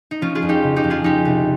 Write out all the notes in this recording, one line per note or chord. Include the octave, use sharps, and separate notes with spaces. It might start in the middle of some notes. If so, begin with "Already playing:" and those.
D#4
F3 C#4 F4
F4 G#4
F2
D#4 G4
C#3
D#4 G4
F2
F4 G#4
F3 D#4 G4
C2